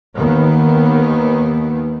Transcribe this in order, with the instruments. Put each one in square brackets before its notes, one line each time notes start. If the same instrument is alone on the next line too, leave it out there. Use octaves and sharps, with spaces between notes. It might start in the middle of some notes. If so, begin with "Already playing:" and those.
[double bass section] D#2 D#3 B3